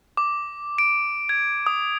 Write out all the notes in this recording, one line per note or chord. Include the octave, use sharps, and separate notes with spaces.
D6
D7
G#6
D#6